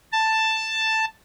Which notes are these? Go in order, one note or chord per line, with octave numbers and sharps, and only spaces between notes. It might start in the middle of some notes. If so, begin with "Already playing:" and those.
A5